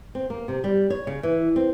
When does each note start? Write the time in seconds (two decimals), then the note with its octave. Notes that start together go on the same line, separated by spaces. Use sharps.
0.15 C4
0.30 A#3
0.48 C3
0.64 G3
0.90 C#5
1.07 C#3
1.23 E3
1.56 C4